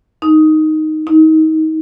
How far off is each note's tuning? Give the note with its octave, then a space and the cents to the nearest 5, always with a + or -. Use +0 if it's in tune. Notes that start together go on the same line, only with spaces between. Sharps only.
D#4 +0
D#4 +25